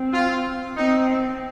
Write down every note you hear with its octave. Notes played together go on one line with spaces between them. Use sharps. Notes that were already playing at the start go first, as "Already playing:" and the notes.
Already playing: C4
F4
C4 D#4